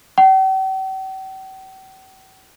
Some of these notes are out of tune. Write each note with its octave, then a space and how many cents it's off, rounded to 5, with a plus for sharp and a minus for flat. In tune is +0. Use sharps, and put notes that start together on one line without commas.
G5 -45